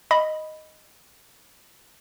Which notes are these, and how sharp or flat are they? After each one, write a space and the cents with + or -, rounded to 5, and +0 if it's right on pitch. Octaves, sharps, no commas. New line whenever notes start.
D#5 +0 B5 +0